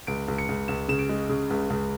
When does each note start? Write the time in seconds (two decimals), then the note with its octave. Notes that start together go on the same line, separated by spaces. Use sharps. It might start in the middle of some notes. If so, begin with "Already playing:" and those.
0.07 C#2 D7
0.28 C#2
0.38 C#7
0.49 C#2
0.68 C#2 E7
0.88 C#3 E7
0.99 D7
1.09 G#3
1.29 C#3
1.50 C#2
1.70 C#2